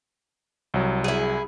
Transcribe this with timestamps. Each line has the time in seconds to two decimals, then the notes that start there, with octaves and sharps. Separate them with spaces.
0.74 C2 F#3
1.04 E4 G#4